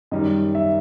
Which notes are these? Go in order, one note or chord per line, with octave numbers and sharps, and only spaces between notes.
F#2 D#3 G3 D#5
E5